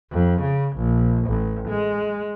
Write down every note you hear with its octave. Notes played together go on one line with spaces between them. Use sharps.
F2
C#3
A#1
A1
G#3